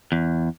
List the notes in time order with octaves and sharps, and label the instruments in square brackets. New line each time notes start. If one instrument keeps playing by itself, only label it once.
[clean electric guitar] E2